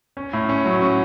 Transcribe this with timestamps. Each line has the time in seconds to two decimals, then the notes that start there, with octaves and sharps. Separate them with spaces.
0.17 C#4
0.33 A2
0.49 C#4
0.65 F#3
0.82 C#4